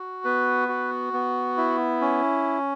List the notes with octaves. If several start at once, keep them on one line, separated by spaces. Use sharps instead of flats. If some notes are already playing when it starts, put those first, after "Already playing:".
Already playing: F#4
B3 B4
F#4
B3
E4
C#4